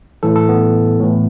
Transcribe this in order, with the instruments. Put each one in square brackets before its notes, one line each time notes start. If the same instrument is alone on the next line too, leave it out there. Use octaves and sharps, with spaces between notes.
[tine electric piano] A2 E3 A4
A4
B3
A2 E3